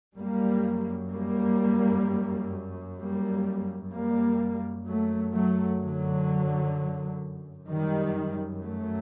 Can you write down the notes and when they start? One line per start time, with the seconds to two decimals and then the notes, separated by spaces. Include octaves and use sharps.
0.18 F#2 G3 A#3
1.12 G3 A#3
3.00 G3 A#3
3.93 F#2 G3 A#3
4.87 F#3 A3
5.34 F#3 A3
5.80 D3 F#3
7.68 F#2 D#3 G3
8.62 F#3 A3